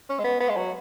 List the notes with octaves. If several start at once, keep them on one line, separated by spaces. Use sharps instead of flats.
C#4
G#3
B3
B3
G#3
F#3